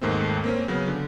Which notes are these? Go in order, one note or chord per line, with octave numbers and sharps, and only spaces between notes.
D#2 G#2 D#3 A3 C4
A#3 C4 C#4
C#3 F#3 B3
D3